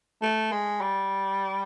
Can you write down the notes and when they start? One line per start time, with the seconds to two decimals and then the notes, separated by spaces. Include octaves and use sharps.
0.22 A3
0.52 G#3
0.81 G3